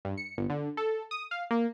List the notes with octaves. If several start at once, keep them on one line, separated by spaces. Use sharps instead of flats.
G2
C#7
G1
D3
A4
D#6
F5
A#3